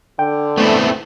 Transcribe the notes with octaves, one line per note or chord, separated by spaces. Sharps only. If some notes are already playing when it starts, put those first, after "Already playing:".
D3 G5
A3 B3 C4 E4